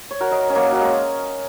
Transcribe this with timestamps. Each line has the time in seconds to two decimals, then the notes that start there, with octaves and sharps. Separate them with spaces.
0.11 C#5
0.20 F#4 A#4
0.31 A#4 D#5
0.50 C#4
0.55 F#3 A#3
0.72 F#3
0.81 G#3